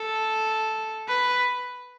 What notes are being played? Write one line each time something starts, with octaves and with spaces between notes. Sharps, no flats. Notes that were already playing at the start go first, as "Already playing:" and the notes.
Already playing: A4
B4